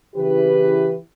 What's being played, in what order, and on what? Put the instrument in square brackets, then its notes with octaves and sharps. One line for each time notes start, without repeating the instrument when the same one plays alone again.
[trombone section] C#3 E3 G4 [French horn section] E4 B4